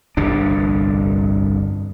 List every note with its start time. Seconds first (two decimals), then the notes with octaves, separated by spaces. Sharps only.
0.17 G1 C2 F2 D4